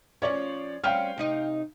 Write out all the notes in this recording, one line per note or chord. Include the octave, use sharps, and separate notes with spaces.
F3 C#4 C#5 D5
G3 C4 C#4 F5 G5 F6
C3 D#4 D#5